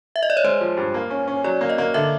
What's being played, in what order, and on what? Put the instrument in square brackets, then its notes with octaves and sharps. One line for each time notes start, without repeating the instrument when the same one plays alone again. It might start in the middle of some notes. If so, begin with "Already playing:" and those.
[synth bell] E5
D#5
D5
C#5
[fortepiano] G#3 [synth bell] C5
[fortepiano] F3
G2
A#3
C#4
C#4
[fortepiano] F#3 [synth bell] D5
[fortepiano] A#3
[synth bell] D#5
[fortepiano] A#3
[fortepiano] D3 [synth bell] E5